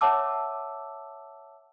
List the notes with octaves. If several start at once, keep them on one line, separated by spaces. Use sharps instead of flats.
C#5 E5 F#5 A5 D6 E6